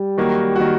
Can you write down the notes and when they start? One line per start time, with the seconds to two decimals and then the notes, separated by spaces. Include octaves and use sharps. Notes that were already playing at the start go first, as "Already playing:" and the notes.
Already playing: G3
0.18 D#3 F#3 A#3 F#4
0.56 D#3 F#3 A#3 F#4